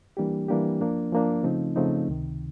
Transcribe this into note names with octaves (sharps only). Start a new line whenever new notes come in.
E3 G3 A#3 D4 G4
E3 G3 A#3 D4 G4
F3 A#3 D4
F3 A#3 D4
C#3 F3 A3 C4 D#4
C#3 F3 A3 C4 D#4
C#2 C3 D#3